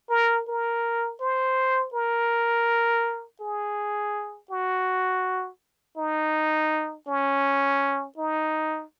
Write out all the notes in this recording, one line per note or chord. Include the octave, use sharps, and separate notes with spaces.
A#4
A#4
C5
A#4
G#4
F#4
D#4
C#4
D#4